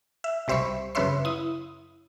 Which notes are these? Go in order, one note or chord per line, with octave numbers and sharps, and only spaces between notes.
E5
C2 G3 C5 E5 B5 C#6
F#2 C#3 B4 C#5 E5 C6
E4 D#6